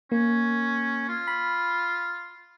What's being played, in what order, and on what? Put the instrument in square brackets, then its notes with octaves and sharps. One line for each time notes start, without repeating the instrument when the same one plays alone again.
[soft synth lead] A#3 [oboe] C#4
[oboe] F4
[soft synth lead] B5